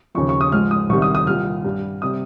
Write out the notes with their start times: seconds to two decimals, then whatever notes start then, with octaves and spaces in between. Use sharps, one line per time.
0.15 D#2 C#3 F3 C#6
0.29 C#6
0.41 D#6
0.52 G#2 F3 G#3 F6
0.71 D#6
0.89 C2 C3 D#3 G3 C#6
1.02 D#6
1.15 D#6
1.27 C2 A#2 G3 F6
1.65 G2 G3
2.02 C3 G3 D#6